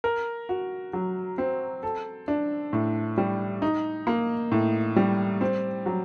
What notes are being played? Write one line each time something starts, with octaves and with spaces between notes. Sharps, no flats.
A#4
F#4
F#3
C4
A4
D4
A2
G3
D#4
A#3
A2
G3
C4
F#3